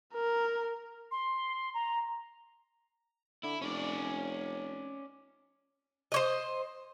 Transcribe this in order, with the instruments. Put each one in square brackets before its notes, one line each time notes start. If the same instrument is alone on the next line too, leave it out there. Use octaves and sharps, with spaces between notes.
[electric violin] A#4
[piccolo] C6
A#5
[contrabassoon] D3 [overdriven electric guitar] E4
[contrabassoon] F1 [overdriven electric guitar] C#4 D5
[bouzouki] C5 C#5 D#5